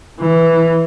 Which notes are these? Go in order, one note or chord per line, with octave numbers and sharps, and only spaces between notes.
E3